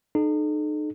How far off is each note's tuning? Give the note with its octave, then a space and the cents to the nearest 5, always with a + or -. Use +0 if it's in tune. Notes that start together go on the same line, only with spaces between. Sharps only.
D#4 -40 A4 -35